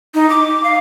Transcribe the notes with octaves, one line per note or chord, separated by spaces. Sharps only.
D#4
D6
F5